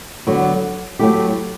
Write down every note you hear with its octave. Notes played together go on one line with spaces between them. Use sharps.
D3 F#3 B3 F#4
F#3 A3 E4 G4